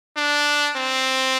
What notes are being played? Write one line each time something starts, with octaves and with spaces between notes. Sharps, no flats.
D4
C4